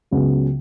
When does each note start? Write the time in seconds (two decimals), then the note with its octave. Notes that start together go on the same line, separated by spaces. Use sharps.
0.11 C#2 C#3 F#3 B3